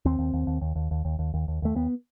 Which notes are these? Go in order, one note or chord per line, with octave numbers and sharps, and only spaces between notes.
D#2 C4
D#2
D#2
D#2
D#2
D#2
D#2
D#2
D#2
D#2
D#2
D#2 A3
D#2 B3